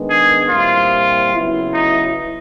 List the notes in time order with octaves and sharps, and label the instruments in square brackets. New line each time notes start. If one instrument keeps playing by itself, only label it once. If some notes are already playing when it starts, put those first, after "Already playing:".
Already playing: [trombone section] D#3 G#3 B3 D4
[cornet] G#4
[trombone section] A#2 G3 C4 E4 [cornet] F4
[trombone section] C#3 F#3 B3 E4
[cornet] D#4